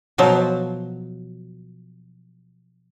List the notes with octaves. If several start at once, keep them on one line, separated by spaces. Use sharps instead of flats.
B2 F3 F#3